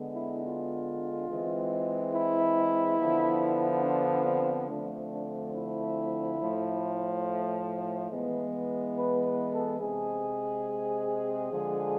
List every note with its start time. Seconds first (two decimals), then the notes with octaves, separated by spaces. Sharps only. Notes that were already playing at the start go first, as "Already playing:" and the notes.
Already playing: D3 G#3 B3
0.14 E4
0.43 F4
1.28 E3 G#3 C4
2.13 E4
2.98 D3 F3 B3
3.83 D4
4.26 C4
4.68 D3 F3 A3 C4 D4
5.11 D4
5.53 E4
6.39 A2 F3 A3
8.09 E3 G#3 B3
8.94 B4
9.23 B4
9.51 A4
9.80 C3 G#3 C4 G#4
11.51 D3 F3 G#3